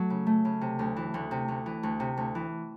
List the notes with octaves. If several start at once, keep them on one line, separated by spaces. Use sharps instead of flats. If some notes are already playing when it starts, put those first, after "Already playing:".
Already playing: F#3 A3
C#3
A3
C#3
C3
D2
E3
D2
C3
D2
E3
D2
C3
D2
E3